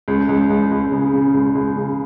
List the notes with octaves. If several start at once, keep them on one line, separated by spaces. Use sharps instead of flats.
C#2
C#2
C#2
C#2
C#3
C#3
C#2
C#2
C#3